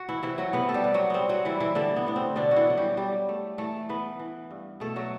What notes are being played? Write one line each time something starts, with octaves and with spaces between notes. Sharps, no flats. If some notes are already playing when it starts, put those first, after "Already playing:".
Already playing: F#4
E3 E4
C3 E3 E4
F#3 F#4
C3 B3 B4
A4
G3 G4
C3
F#3 F#4
G3 B3 C4
F#3 F#4
E3 G3 E4
E3 E4
D3 G3 D4
B3
A2 B3
C4
B2 D3 D4
F#4
E3 E4
F#3 F#4
G3 G4
F#3 G3 G4
A3
E3 A3 A4
E3 B3 B4
E3
G2
B2 A3 A4
F#3 F#4